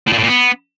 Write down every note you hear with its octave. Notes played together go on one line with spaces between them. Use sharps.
A2
A#2
A2
A#2
B3